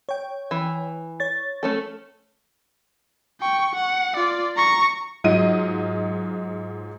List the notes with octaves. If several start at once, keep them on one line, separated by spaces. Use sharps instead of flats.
C#5 G5
E3
C#5 A6
A3 C#4 A4
G5 C#6
F#5
F4 D5
A#5 C#6
G#2 F#3 F4 D#5 D#7